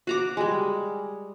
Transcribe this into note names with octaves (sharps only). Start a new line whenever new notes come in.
F#4 A#5 D6
G3 G#3